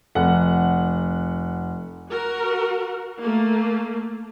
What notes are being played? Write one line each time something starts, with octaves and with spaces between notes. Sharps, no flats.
F1 F#5
F#4 A#4
A3 A#3